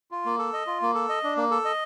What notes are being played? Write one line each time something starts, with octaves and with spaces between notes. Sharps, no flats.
F4
A#3
A4
D#5
F4
A#3
A4
D#5
D4
A#3
A4
D#5